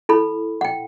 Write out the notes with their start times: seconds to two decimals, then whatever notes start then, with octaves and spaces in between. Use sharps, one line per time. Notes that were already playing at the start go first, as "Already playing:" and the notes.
0.09 E4 A4 B5
0.61 F#5 G5